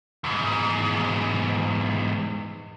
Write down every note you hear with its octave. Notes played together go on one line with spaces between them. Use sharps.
E2 G#2